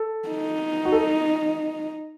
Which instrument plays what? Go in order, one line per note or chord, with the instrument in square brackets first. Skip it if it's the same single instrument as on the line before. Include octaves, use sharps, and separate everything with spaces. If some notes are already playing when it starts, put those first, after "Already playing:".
Already playing: [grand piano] A4
[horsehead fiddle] D#4
[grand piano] F#4
A4